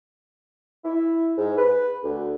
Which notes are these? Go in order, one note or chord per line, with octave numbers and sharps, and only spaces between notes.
E4
G#2
B4
D2